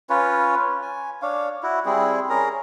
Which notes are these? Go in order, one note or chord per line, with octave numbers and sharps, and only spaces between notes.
C#4 F4 B4 C#5
G#5
D4 C#5 F5
E4 F#4
G3 C4 E4 G#4
C#4 G#4 A#4 A#5